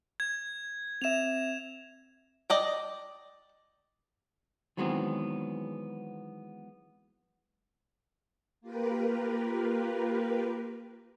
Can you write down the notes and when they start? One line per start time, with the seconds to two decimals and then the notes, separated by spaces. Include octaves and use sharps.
0.20 G#6
1.02 C4 E5 E7 F7
2.50 D5 D#5 G5
4.77 D#3 E3 F#3 G#3 B3 C4
8.61 A#3 F4 G4 A#4 B4